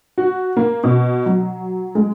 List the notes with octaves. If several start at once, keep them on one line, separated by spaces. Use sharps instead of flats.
F#4
A#3
B2
F#3
G#3